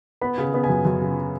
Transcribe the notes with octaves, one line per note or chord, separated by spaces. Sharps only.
B3 B5
C#3
B3
G#5
F#2
F#2
C#3